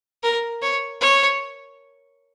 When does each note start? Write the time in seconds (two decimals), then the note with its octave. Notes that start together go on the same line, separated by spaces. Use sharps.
0.23 A#4
0.62 C#5
1.01 C#5